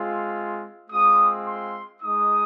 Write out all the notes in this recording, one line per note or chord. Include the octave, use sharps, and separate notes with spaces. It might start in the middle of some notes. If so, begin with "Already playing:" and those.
Already playing: G#3 C4 F4
G#3 C4 F4 D#6
C6
G#3 D#4 D#6